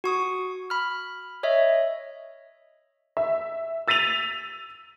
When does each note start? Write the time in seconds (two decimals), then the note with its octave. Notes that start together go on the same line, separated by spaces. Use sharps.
0.04 F#4 C#6 D#6
0.70 B5 F6
1.43 C#5 D#5 E5
3.17 E5
3.88 E6 A6 B6 D#7 F7